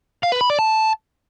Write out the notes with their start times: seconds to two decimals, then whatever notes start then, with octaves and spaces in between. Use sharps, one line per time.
0.23 F5
0.32 B4
0.41 B5
0.50 D5
0.59 A5